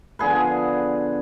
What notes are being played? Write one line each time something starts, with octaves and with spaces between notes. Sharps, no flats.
D3 F3 B3 G#4 B4